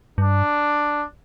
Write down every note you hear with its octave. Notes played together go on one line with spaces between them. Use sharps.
G2 D4